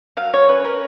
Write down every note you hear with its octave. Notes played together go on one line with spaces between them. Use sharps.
F#3 F5
F#3 C#5
C#4 B4
C#4 A#4